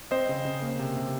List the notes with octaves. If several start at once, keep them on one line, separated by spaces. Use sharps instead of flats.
C4 C5 D#5
C#3
C#3
A#3
C3
C3